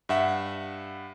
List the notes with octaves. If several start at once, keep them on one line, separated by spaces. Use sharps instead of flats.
G2 E5 F#5